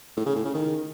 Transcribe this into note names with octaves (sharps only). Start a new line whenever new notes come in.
A2
C#3
A2
C#3
D#3